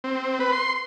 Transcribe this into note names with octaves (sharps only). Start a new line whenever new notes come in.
C4
B4
C6